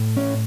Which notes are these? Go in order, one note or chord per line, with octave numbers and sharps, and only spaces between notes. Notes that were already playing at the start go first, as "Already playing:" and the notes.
Already playing: A2
C#4